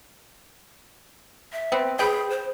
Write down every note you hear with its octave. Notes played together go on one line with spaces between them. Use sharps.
E5
B3 C4
G#4 B4 G5
C5